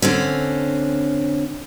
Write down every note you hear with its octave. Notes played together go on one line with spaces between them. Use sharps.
D3 C4 C#4